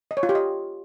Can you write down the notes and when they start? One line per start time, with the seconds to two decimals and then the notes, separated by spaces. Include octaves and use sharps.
0.11 D#5
0.17 C#5
0.23 F4
0.29 G4
0.35 D#5